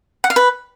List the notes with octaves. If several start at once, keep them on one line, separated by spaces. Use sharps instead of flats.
F#5
F5
B4